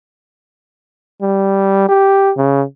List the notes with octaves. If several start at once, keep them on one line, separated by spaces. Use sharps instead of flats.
G3
G4
C#3